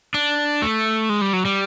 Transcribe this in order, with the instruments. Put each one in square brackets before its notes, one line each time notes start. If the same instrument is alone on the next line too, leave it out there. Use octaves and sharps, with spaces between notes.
[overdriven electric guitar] D4
A3
G#3
G3
F#3
G3